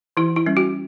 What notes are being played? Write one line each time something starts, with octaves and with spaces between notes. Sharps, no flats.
E3 E4
E4
G3 C#4
F#4